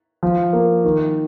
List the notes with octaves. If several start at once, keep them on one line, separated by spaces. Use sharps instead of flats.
F3
A#3
D#3